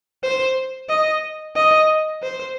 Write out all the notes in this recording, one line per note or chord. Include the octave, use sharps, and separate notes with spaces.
C5
D#5
D#5
C5